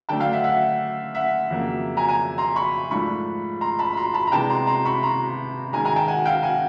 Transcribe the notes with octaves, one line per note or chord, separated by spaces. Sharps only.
D3 F#3 A3 D4 G5 A5
F5 G5
E5 F#5
E5 F#5
E5 F#5
F2 C#3 F#3 A#3
G#5 A#5
G#5 A#5
A#5 C6
B5 C#6
G#2 F3 A3 D4 B5 C#6
A#5 C6
A5 B5
B5
A#5 C6
A5 B5
A#5
C3 E3 G#3 B3 D4 G5 A5
A#5 C6
A#5 C6
B5 C#6
A#5 C6
G#2 D#3 G#3 G#5 A#5
G#5 A#5
G5 A5
F#5 G#5
F5 G5
F#5 G#5